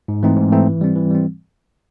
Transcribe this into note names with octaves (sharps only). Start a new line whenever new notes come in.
G#2
E3 A3 C4 D#4
G#2
E3 A3 C4 D#4
E3
G3 C4
E3
G3 C4